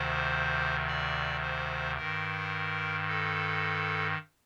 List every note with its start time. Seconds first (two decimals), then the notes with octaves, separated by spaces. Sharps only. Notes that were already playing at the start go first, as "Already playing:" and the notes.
Already playing: D2 C3 D#3 C5
0.87 D5
1.42 C5
1.97 G2 D#3 A#4
3.08 A4